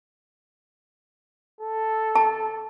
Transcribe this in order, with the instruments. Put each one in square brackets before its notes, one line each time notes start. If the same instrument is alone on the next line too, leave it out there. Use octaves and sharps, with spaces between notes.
[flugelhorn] A4
[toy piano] A5